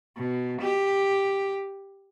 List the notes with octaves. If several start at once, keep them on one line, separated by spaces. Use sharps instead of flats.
B2
G4